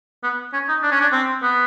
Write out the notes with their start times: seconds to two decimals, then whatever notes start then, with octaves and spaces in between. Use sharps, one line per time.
0.23 B3
0.53 C#4
0.69 D#4
0.83 D4
0.92 C#4
1.01 D4
1.12 C4
1.43 B3